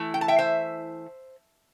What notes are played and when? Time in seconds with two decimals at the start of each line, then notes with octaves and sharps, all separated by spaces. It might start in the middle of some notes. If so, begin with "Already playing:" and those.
Already playing: E3 A3 E4
0.14 G5
0.21 A5
0.28 E5 G5
0.38 C5 E5